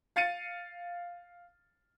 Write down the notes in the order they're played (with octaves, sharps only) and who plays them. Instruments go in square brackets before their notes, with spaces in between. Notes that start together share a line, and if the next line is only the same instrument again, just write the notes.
[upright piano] F5 A6 C#7 D#7